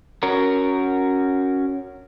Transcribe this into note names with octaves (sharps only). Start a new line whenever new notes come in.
C#4 F#4 A#4